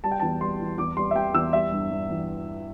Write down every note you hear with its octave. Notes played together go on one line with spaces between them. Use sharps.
G3 A5
G5
E2 A5
G3 C6
E3
E2 D6
G3 C6
E5
G3 G5
E2 E6
G3 E5
G2
G2
E3